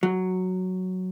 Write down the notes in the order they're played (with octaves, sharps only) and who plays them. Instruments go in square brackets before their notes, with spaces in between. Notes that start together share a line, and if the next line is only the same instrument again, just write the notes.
[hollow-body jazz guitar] F#3